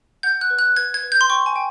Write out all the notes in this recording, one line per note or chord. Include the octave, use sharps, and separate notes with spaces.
F#5 G6
F#6
B4
F#6
B4 G#6
G#6
B4
G6
C6
G5 C#6
G#5
G5